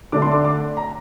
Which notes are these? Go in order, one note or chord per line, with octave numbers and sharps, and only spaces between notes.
D3 A3 D4 D6
C6
D6
D6
A#5